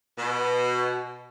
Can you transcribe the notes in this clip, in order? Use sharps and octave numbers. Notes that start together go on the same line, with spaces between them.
B2